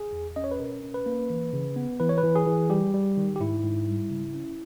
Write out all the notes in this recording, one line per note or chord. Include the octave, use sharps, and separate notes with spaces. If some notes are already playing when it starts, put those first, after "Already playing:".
Already playing: G#4
E2
C#4 D#5
C#5
B4
B2 A#4
C#4
B4
A#3
E3
C#3
B3
E3 B4
C#5
B4
E3
G#4
E3
G3 G4
G3
D#3
G4
G#2 E4
G#2
G3
C#3
C#4